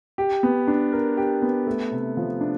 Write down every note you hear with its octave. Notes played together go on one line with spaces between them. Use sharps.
G4
B3
D4
A#4
G4
B3
A3
C3
F3
D4